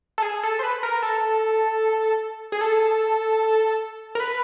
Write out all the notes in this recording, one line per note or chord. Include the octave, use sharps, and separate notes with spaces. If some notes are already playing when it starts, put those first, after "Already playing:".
A4
G#4
A4
C5
B4
A#4
A4
G#4
A4
A#4
B4